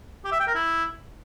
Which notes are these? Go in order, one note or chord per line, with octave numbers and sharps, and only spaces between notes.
G4
E5
G5
A#4
E4